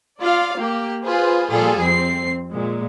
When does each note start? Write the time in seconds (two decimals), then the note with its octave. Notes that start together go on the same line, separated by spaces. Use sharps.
0.21 F4 D5 F5
0.59 A#3 G4
1.03 F4 G#4 B4 C5
1.50 A#2 F3 G3 F4 G#4 A4
1.80 F2 C4 C7
2.50 A#2 G#3